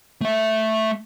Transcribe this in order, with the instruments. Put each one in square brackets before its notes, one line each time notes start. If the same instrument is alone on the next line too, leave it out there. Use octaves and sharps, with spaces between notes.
[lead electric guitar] A3 E5